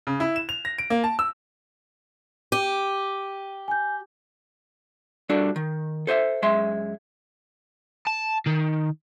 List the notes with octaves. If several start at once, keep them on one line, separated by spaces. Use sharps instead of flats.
C#3
E4
E7
F7
A#6
D7
A#3
A5
E6
G4 D#7
G#5 G6
G3 D4 F#4 A4
D#3
A4 C5 D#5 E5
F#2 G#3 E5 C6
A5
D#3